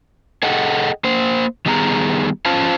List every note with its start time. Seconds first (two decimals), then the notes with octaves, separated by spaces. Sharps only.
0.43 G#4 A4 D#5 F#5 G5
1.04 A#3 C5
1.66 D#3 G3 B3 G#4 A#5
2.45 C#4 F4 C5 F5 A5